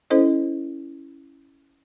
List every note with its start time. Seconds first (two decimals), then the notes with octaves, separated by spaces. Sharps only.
0.10 C#4 E4 A4 C5 D#5